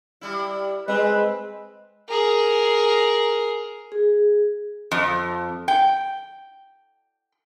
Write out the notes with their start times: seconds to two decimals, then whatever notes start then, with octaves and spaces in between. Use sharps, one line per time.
0.21 G3 E4
0.88 G#3 C4 B4 D#5
2.09 G#4 A#4
3.92 G#4
4.91 F2
5.68 G5